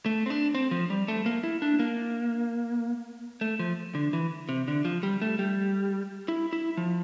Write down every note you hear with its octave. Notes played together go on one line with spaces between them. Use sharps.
A3
C4
D4
C4
F3
G3
A3
A#3
E4
D4
A#3
A3
F3
D3
E3
C3
D3
F3
G3
A3
G3
E4
E4
F3